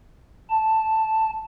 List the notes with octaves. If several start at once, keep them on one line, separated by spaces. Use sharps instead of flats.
A5